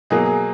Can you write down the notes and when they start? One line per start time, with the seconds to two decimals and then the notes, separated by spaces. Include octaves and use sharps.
0.10 B2 F#3 A#3 G#4
0.26 G#4